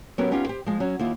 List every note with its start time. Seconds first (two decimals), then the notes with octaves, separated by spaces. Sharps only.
0.18 F#3 B3 C#4 G4 A#4 B4
0.31 B3 C#4 D#4 F4 G4
0.47 G4 C5
0.66 F3 G#3
0.80 F#3 C#4
0.99 D#2 E4 F4